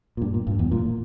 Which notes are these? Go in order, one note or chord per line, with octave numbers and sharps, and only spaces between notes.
A#2
G2
A#2
G2
E2
A#2